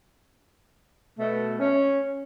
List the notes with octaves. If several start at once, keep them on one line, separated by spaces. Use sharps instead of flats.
B2 A3
C#4